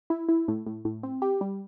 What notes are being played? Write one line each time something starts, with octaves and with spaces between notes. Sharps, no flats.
E4
E4
A2
A2
A2
C4
G4
G3